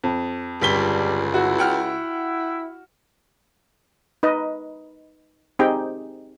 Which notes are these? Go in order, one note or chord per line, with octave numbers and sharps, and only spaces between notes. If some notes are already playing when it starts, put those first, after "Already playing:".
F2
G1 C#2 G3 B6 G7
E4 F#4
F#5 G5 F6
D#4 B4 D#5
C4 D#4 G4 G#4 G5